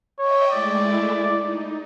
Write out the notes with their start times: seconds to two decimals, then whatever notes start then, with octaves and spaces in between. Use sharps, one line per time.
0.19 C#5 D#5 E5 G5
0.51 G#3 A3 E4 D5
1.37 D#4